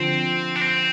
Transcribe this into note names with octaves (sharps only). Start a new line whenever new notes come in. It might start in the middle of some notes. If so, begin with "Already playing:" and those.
Already playing: D3 F3 C4
D4
C4